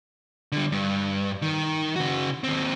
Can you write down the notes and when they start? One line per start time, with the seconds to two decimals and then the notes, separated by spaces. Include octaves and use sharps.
0.52 D3 G3
0.72 G2
1.42 D#3
1.96 C#3 F#4
2.44 D#2 C4